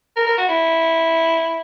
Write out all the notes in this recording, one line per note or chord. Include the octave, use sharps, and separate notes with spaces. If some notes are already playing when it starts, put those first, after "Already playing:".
A#4
A#4
F#4
E4